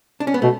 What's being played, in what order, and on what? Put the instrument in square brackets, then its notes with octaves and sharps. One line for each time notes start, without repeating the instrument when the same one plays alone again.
[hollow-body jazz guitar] D4
C#4
B3
[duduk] B2 [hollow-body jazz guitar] A3